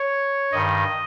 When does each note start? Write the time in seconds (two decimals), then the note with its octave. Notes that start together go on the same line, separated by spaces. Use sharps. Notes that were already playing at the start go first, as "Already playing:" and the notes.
Already playing: C#5
0.52 G2 D#3 D#5